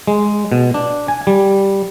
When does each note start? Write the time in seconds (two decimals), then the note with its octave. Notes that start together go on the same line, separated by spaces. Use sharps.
0.07 G#3
0.52 B2
0.74 D4
1.08 G#5
1.27 G3